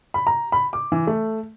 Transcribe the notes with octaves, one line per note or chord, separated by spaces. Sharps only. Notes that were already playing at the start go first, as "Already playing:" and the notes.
B5
A#5
B5
D6
E3
A3